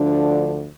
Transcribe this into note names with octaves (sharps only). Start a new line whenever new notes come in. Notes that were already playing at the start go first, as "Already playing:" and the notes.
Already playing: D2 D3 F3 D4